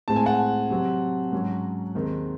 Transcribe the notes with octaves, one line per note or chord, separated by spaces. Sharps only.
A2 G#3 C4 A5
G#5
F#5 A5
C3 F#3 C4
G#2 F#3 C#4
D#2 D#3 G#3 C4